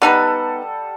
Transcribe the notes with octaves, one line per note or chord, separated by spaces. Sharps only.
G3 B3 D#4 A4 B4 F#5